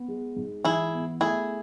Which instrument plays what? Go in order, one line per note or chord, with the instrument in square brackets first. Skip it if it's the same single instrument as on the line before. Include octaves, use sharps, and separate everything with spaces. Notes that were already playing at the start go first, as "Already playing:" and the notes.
Already playing: [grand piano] B3
G#3
G#2
[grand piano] E3 [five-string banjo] E4 G#4
[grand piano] B3
[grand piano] A3 [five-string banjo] E4 G#4